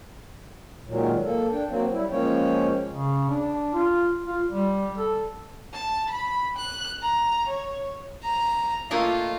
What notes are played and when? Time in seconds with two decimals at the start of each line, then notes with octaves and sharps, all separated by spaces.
0.87 A#2 D#3 F#3 G#3
1.25 A#3 A4
1.51 D4 G5
1.68 F#3 A#3 C4
1.92 G3 E4
2.10 F3 G#3 A#3 C#4 C#5 G5
2.92 C#3
3.29 D4
3.73 F4
4.26 F4
4.49 G3
4.97 A4
5.73 A5
6.10 B5
6.56 F#6
7.02 A#5
7.47 C#5
8.24 A#5
8.91 A3 A#3 F4 D#5